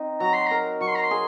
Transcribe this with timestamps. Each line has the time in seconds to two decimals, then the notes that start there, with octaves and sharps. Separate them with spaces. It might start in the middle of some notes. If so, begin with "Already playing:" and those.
Already playing: C4 D#4
0.20 F#3 A#5
0.33 C6
0.46 A#4 A#5
0.81 F#3 C#6
0.88 C6
0.95 A#5
1.02 C6
1.11 G#4